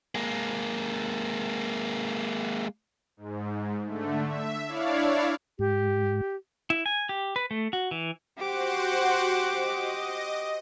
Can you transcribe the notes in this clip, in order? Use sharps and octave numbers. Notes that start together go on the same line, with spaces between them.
G#3 A#3
G#2
D3 A3
E5
D4 E4 C#5 D5 F5
G#2 G4
E4
G#5
G4
B4
A3
F#4
E3
F#4 G4 C5 F#5 D6
D#5